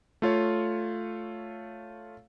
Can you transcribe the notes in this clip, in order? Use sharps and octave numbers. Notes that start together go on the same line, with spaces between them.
A3 F4 C#5 F5